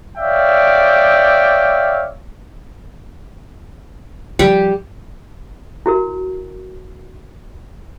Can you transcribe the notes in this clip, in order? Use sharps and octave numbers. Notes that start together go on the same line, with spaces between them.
C#5 D5 E5 F5 G5
F3 G3 G4
E4 F#4 A#4